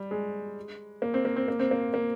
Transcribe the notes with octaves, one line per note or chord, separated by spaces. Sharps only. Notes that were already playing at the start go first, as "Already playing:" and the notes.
Already playing: G3
G#3
A#3
C4
A#3
C4
A#3
C4
A#3
A#3